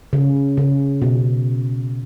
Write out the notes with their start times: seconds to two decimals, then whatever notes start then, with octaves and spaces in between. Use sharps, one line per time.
0.13 C#3
0.57 C#3
1.02 B2